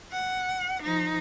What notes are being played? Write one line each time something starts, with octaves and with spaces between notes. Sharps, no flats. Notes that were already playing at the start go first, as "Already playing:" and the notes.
F#5
F3 D#4